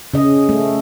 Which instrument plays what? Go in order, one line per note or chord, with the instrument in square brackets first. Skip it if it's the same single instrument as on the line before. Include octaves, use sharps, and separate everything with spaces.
[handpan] C#3 D#5
A3